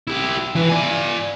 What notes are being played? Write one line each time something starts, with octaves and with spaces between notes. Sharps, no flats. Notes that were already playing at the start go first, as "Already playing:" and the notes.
E4 G4
E3 B4
D5 G#5